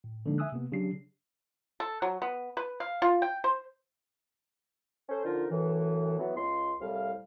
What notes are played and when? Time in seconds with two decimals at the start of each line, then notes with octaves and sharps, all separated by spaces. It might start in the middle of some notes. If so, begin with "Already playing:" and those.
0.04 A2
0.26 D3 F3 G#3 A#3 D4 D#4
0.38 E5 G#5 D#6 E6 F#6
0.52 C3 A#3 B3
0.72 C#3 F#3 D4 G4 C7
1.80 A4
2.02 F#3
2.22 B3
2.57 B4
2.80 F5
3.02 F4
3.22 G5
3.44 C5
5.09 C#4 A4 C5
5.25 D3 F3 D#4 F4 A#4
5.51 F#2 A2 E3
6.19 E3 F#3 B3
6.36 C#2 C6
6.81 C2 A2 G3 F5